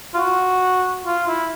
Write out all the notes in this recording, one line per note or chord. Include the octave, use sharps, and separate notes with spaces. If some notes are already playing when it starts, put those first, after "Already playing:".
F4
F#4
F4
E4